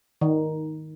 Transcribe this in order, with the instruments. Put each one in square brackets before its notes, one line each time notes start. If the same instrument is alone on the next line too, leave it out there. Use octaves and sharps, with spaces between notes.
[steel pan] D#3